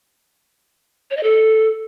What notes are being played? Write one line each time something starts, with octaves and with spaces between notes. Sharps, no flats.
C#5
D#5
A4